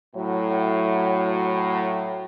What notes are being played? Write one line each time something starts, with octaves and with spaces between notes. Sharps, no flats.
A2 F#3